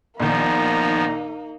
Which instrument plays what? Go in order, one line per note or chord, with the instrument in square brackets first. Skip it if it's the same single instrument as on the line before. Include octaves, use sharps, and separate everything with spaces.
[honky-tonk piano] A#1 A#2 D#3 [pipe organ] F3 B3 [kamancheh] A#3 D#4 [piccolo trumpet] A#5